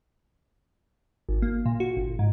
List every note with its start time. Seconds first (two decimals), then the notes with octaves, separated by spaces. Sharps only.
1.29 G#1
1.42 A#3
1.66 A#2
1.80 F#4
1.97 G1
2.19 G#2